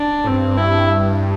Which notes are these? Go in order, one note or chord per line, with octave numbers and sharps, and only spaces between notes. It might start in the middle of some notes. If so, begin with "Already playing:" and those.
Already playing: D4
A2
G2 C4
E4